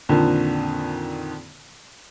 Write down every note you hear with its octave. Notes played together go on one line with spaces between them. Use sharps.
F2 A#2 D3 D#3 F3